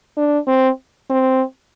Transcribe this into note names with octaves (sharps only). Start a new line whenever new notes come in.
D4
C4
C4